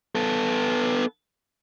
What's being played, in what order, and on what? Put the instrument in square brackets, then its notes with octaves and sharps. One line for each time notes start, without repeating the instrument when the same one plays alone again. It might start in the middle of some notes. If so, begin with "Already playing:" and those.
[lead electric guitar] B3 A4